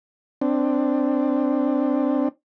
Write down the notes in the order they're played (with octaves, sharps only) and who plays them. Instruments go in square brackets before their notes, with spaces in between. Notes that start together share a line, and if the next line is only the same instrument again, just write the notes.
[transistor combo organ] C4 D4